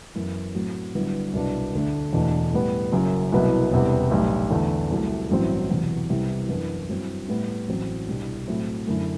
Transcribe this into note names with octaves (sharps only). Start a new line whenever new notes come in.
F#2 E3 B3 E4
A2 F#3 C4
G1 G2 F#3 B3 E4
C2 B2 F#3 B3 D4
D2 D3 A3 D4
E1 E2 B2 A3 D4
A2 G3 B3
F#1 F#2 F#3
C2 B2 F#3 B3 E4
E1 E2 C3 G3 B3
B1 A2 E3 G3
E2 D3 A3
C2 C3 F#3 A3
A1 G2 F#3 C4 E4
E1 E2 C3 F#3
C2 C3 G3 B3 E4
F#2 E3 B3 D4
G2 F#3 C4 E4
A2 G3 B3 E4
A1 A2 F#3 C4
C2 B2 G3 D4
A2 F#3 A3 C4 E4
F#2 D3 A3 E4